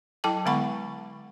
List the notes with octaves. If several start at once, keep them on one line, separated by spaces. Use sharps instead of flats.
F#3 E4 A4 G5 A5 D6
D3 G#3 B3 F#5 B5 C#6